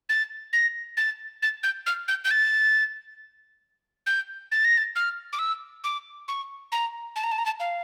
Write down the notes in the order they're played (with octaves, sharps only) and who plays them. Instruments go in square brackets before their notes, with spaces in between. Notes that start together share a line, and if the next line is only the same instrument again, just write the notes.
[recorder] A6
A#6
A6
A6
G6
F6
G6
G6
A6
G6
A6
A#6
A6
F6
D6
E6
D6
C#6
A#5
A5
A#5
A5
A#5
A5
F5